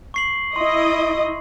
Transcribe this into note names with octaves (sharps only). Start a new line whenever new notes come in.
C#6 C7 F#7
E4 D#5 C6